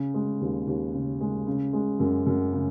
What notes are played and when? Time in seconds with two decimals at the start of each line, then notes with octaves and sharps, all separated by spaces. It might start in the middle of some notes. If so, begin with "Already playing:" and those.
Already playing: C#3
0.14 G#3
0.41 D#2
0.67 D#2
0.94 C#3
1.21 G#3
1.47 C#3
1.73 G#3
2.00 F#2
2.27 F#2
2.53 C#3